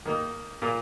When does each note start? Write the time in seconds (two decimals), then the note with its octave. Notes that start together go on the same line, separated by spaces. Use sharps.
0.06 D#3 A#3 D#4
0.62 A#2 A#3 F4 A#4